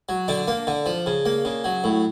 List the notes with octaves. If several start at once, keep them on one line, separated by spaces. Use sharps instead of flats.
F#3
D3 D4
A#3
D3
F3
C#3
A#3
C#3
F#3
A2